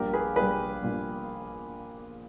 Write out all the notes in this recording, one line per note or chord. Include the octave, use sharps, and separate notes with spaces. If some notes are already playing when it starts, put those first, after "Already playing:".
Already playing: A#1 A#2 G3 G4 A#4
G#4 B4
A#1 A#2 G3 G#4 B4
A#1 A#2 G3